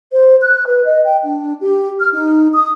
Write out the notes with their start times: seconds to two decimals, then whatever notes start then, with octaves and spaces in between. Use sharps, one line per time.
0.12 C5
0.41 F#6
0.67 B4
0.85 D#5
1.05 G5
1.23 D4
1.61 G4
2.00 F6
2.13 D#4
2.53 D#6